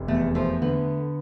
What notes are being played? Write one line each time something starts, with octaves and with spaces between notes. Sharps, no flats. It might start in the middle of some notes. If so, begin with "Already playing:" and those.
Already playing: F1
E2 A3
F3 A3
D3 B3